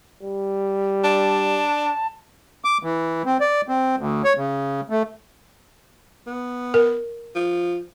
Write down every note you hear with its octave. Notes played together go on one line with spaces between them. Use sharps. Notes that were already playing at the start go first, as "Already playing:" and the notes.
G3
D4 A5
D6
E3
C4
D5
C4
D2
C#5
C#3
A3
B3
A#4
F3